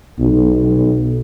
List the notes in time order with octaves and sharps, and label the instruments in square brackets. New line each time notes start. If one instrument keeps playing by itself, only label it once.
[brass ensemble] B1